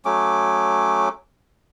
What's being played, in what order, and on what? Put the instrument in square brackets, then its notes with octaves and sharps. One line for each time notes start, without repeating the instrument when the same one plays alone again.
[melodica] F#3 A3 C#4 D6